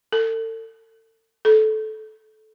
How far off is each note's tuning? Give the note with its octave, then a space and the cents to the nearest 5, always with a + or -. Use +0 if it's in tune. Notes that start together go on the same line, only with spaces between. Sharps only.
A4 +35
A4 -20